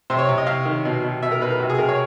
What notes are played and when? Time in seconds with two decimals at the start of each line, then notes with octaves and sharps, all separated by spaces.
0.10 C3 C5
0.19 C#5
0.29 C3
0.38 D#5
0.46 C3 F5
0.65 D#3
0.85 B2
1.04 B2
1.22 B2 E5
1.32 A#4
1.41 B2 B4
1.50 A#4
1.59 C3 F#4
1.70 G#4
1.78 C3 A#4
1.89 C#5